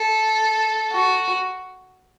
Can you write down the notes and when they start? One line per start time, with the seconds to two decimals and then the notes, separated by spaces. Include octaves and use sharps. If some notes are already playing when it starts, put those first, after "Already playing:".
Already playing: A4
0.92 F#4